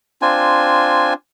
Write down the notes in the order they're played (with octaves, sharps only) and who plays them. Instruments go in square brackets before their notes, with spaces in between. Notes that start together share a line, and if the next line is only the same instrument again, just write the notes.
[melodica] C4 D4 F4 G#5